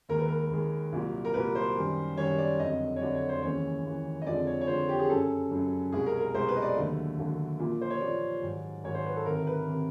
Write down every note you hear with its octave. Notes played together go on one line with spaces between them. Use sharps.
D#2 D#3 G#3 A#4
B4
A#4
D#2 D#3 G#3
C2 A#2 F#3
A#4
C2 A#2 F#3 B4
C5
F#2 D#3 G3
F#2 D#3 G3 C#5
D5
F2 D3 F#3 D#5
C#5
F2 D3 F#3 D5
C#5
C5
D#2 C#3 E3 G#3 C#5
D#2 C#3 E3 G#3
D#5
F2 D3 F3 G#3 D5
C#5
C#5
F2 D3 F3 G#3 C5
G4
G#4
F#2 C#3 F#3 A4
F#2 C#3 F#3
C2 B2 G#3 G#4
A#4
A#4
C2 B2 G#3 C5
B4
D#5
D5
D#2 D3 F#3 A3
D#2 D3 F#3 A3
A#2 F3 A#3
C5
C#5
A#2 F3 A#3 D5
G#2 D#3 F#3
G#2 D#3 F#3 C#5
C5
B4
A4
D2 C3 D#3 A#4
B4
C3 D#3